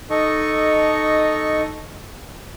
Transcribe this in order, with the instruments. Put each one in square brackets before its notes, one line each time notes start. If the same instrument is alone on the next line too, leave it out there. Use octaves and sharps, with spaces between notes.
[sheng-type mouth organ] D#4 A4 D#5 C#6